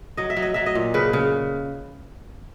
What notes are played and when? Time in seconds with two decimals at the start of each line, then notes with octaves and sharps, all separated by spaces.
0.17 F#3 D#5
0.30 E5
0.37 F#3
0.42 D#5
0.54 F#3 E5
0.66 D#5
0.75 A#2
0.94 C#3 B4
1.13 C#3